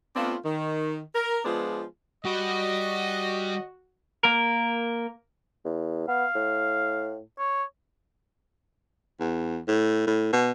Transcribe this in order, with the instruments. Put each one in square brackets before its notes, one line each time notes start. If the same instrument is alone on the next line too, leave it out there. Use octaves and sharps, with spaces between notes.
[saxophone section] A3 B3 C4 D4 F4
D#3
A#4
F3 G#3 B3 D4 F4 G#4
[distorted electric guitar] G3 B5 [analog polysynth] F#4 [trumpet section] D#5
[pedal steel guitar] A#3 A#4
[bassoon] E2
[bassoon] B3 [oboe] F5
[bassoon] A2
[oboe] C#5
[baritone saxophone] E2
A2
A2
B2